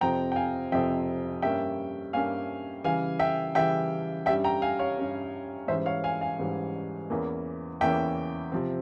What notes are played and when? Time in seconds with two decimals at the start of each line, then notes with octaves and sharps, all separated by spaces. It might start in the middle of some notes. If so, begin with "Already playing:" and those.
0.01 F2 C3 F3 C4 G5 A#5
0.32 G5
0.36 F5 G#5
0.72 F2 C3 F3 C4 E5 G5
1.42 G2 G3 A#3 C#4 E5 G5
2.13 G2 G3 A#3 C#4 F5 G#5
2.84 C#3 E3 G3 F5 G#5
3.19 E5 G5
3.55 C#3 E3 G3 E5 G5
4.26 G2 G3 C#4 E5 G5
4.44 G5 A#5
4.62 F5 G#5
4.79 C#5 F5
4.98 G2 G3 C#4
5.68 G#2 E3 G3 C#4 C5 E5
5.86 C#5 F5
6.04 F5 G#5
6.21 F5 G#5
6.39 G#2 E3 G3 C#4
7.10 E2 E3 A#3 C#4
7.81 E2 E3 A#3 C#4 E5 G5
8.52 C3 F3 C4